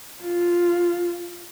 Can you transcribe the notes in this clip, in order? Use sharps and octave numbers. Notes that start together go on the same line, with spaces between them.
F4